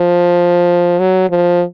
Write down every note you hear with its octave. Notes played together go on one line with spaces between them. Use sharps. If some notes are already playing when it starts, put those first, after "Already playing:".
Already playing: F3
F#3
F3